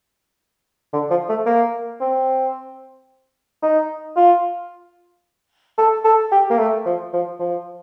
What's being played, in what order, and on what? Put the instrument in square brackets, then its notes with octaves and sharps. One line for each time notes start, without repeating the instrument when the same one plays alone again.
[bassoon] D3
F3
A3
A#3
C4
D#4
F4
A4
A4
G4
A#3
A3
F3
F3
F3